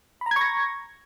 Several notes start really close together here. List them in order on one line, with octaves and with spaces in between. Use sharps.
B5 A#5 G#6 C#6 A#6